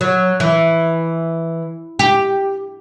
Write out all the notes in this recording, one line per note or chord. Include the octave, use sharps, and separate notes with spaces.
F#3
E3
G4